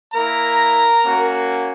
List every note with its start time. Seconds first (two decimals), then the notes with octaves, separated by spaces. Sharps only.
0.14 A#3 E4 A#4 A#5
1.03 A#3 C#4 F#4